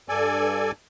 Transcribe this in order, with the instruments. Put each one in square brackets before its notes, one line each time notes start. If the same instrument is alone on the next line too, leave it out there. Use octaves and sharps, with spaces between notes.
[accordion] G2 A4 D5 G#5